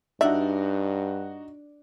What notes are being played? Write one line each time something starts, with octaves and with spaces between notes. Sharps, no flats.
G2 D4 D#4 F#4 D5 E5